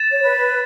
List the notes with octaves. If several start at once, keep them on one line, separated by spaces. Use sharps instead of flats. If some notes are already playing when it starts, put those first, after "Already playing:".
Already playing: A6 E7
C#5
B4